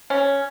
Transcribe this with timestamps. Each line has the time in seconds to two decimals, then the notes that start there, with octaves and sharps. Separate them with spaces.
0.10 C#4